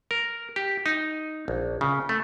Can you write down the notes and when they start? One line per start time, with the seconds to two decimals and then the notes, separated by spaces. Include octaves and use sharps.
0.11 A#4
0.56 G4
0.86 D#4
1.48 A#1
1.81 C#3
2.09 A3